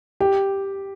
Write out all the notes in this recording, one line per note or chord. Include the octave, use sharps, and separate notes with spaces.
G4